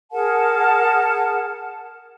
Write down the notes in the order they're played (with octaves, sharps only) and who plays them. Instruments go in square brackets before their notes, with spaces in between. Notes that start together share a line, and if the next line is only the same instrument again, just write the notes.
[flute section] G#4 A#4 F#5 A5